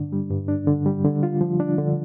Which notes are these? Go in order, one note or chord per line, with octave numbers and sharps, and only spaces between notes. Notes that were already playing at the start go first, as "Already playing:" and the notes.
Already playing: G2 D3 D4
G3
G2
D4
D3
G3
D3
F4
F3
D4
D3